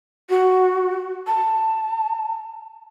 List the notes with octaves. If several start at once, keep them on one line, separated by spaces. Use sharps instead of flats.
F#4
A5